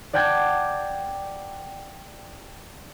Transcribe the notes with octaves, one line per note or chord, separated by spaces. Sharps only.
D5 F#5 G5 A5 G#6 A6